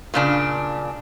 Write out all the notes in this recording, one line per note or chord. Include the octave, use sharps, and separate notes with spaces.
A#2 C#3 D4